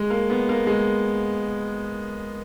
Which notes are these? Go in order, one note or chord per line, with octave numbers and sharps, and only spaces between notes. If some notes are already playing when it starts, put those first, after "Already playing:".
Already playing: G#3
A#3
B3
A#3
G#3